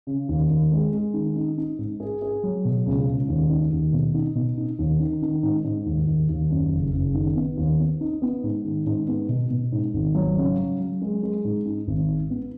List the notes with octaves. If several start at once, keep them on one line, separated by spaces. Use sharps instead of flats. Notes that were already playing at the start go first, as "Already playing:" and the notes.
C#3
D#2
D#2
G#3
G#3
D#3
D#4
D#4
G#2
G#4
G#4
F#3
B2
C#2
C#2
D#2
D#4
D#2
B2
D#4
B2
D#4
D#2
D#3
D#3
G#2
G#2
D#2
D#2
D#2
F#2
F#1
F#1
D#3
B3
D#2
B3
D#4
B3
G#2
D#3
G#2
B3
B2
B2
G#2
G#1
F#3
C#3
F#3
F#3
G#3
G#3
G#2
D#4
G#1
G#2
B3